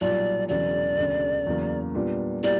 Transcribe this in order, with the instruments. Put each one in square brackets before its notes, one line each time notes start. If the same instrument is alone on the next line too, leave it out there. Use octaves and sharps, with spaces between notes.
[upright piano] B1 A#2 G3 [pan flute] D5
[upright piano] E1 E2 C#3 F#3 [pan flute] D5
[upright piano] E1 D2 C#3
E2 C#3 F#3 A#3
A#2 G3 B3 D4
[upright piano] B2 G3 A#3 E4 G4 [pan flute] D5